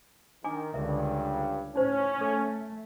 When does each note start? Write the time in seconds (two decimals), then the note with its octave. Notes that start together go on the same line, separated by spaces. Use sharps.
0.44 D#3 D4 G#5 D6
0.74 C#2 G2 D3 A#4 E5
1.76 A2 C#4 D#4 C5
2.21 A3 A4